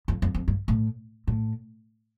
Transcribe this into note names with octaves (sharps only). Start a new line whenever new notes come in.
F2
F2
F2
G2
A2
A2